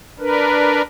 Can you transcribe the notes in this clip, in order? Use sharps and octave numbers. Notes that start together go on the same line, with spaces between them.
D4 A#4 B4